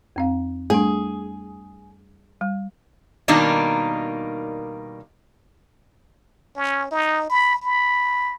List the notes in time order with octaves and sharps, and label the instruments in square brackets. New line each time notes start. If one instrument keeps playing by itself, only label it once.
[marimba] F2 C4 F5
[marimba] G3 D4 [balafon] A3 [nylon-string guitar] G#4
[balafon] G3
[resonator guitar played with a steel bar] B2 D#3 G3 A#3 D4 D#4
[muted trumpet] C#4
D#4
B5
B5